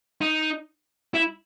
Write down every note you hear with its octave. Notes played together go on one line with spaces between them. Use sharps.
D#4
E4